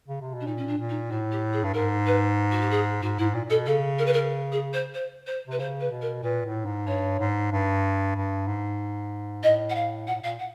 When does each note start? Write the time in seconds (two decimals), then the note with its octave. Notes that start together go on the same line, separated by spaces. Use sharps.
0.08 C#3
0.21 C3
0.34 B2
0.41 D4
0.46 A#2 D#4
0.57 C#4
0.68 D4
0.78 A#2
0.89 D#4
1.10 A2 F#4
1.32 G4
1.53 G#4
1.64 G2
1.74 G#2 A#4
2.06 B4
2.52 F#4
2.61 G4
2.70 G#4
3.02 G#2 F#4
3.19 G#2 E4
3.34 A#2
3.45 A#2
3.50 B2 A4
3.66 C#3 A4
3.99 A#4
4.06 B4
4.13 A#4
4.52 G#4
4.73 C5
4.94 C5
5.27 C5
5.47 C3 B4
5.59 C#3 C5
5.80 B4
5.91 B2
6.02 A#4
6.23 A#2 B4
6.45 A2
6.65 G#2
6.87 G2 C#5
7.19 G#2
7.51 G2
8.16 G2
8.47 G#2
9.43 A2 D#5
9.70 F#5
9.75 F5
10.07 A#2 F#5
10.15 A2
10.22 A#2 F5
10.39 F#5